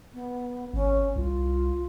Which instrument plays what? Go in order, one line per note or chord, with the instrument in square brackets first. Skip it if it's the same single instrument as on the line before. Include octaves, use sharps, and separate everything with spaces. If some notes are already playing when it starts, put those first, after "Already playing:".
[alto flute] B3
[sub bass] G#1 [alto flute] C#4
[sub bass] C2 [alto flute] F4